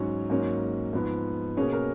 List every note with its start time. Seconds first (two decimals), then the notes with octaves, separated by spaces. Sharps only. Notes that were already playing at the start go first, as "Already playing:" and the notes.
Already playing: G#2 F#3 C#4
0.30 G#2 F#3 A#3 C#4
0.93 G#2 F3 B3
1.57 B2 A#3 C#4 G#4
1.73 A#4